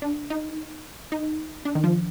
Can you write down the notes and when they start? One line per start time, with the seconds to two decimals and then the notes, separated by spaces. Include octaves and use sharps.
0.02 D4
0.30 D#4
1.12 D#4
1.65 D4
1.75 D#3
1.84 F3